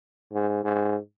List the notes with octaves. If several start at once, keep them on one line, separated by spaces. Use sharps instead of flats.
G#2
G#2